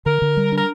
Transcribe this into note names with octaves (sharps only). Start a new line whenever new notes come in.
D3 A#4
D3
G3
D4 A#4